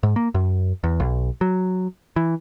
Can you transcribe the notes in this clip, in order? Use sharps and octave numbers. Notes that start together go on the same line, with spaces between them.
G#2
A#3
F#2
E2
B1
F#3
E3